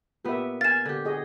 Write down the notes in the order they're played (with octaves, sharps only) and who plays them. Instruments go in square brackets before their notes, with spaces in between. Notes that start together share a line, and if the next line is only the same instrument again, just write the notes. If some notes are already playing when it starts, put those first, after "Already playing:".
[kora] A#2 B3 [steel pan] G4 E5
[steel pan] F5 G#5 [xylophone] A6 E7
[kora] D3 G4
[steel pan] F#4 G#4 D#5